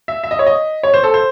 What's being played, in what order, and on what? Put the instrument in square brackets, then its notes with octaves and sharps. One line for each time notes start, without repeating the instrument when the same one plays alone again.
[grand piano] E5
E5
D#5
C#5
D#5
C#5
C5
A4
C5